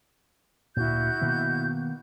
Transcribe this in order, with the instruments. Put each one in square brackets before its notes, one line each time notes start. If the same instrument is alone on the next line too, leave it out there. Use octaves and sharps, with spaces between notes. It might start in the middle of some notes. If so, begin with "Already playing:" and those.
[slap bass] D2 A#2 [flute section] E4 F#4 G6
[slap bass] B2 D#3 A#3